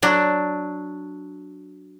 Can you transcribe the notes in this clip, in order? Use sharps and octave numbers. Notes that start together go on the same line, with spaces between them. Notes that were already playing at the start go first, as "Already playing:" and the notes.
F#3 D4